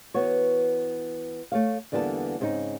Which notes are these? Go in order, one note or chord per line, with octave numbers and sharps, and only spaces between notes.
E3 B3 F#4 C#5
A3 C#5 F5
E2 D3 G3 A#3 B3 A5
G#2 C#3 B3 C4 D#4